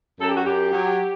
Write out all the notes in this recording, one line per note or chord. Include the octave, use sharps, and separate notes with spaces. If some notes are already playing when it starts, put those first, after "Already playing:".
F#2 A4
G4
F#4
F#2 G4
F#3